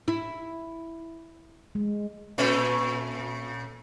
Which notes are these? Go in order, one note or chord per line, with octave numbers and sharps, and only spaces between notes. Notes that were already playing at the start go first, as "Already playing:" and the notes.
E4
G#3
A#2 A3 C#4